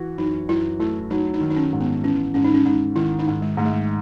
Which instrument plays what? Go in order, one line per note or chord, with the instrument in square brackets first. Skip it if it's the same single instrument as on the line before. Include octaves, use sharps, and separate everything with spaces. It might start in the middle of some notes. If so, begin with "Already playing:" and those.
Already playing: [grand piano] E3 F#4
[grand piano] F#2 [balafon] D#4
[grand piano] F#2 [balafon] E4
[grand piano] A3 [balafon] E4
[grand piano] F#3 [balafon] D#4
[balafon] D#4
[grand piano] D#3
[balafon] D#4
C#4
[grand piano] G#2
[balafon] B3
[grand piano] E3 [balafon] C#4
[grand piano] G#2 [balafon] C#4
[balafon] D#4
C#4
[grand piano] G#2 [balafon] D#4
[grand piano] D#3 [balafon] E4
[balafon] D#4
[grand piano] G#2
[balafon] G#3
[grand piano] G#2 [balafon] A3
[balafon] G#3